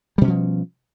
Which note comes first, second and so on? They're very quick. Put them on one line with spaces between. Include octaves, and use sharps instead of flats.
G3 B2 C#4 F3